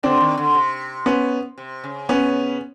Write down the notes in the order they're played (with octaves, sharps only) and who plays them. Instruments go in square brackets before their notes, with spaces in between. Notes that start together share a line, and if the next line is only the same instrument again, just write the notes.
[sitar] D3 [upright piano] C4 D4
[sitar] D#3
D3
C3
[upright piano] B3 C#4
[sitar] C3
C#3
[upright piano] B3 C#4